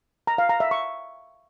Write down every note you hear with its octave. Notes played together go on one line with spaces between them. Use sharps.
A#5
F5
A#5
E5
C#6